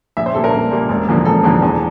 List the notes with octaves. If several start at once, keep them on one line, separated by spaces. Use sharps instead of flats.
A#1 E5
C5
A#2 G3 A#3 A4
A#4
A#1
A#2 G3 A#3
E1
E2 D3 F3 A#3
E1 A4
E2 D3 F3 A#3
E2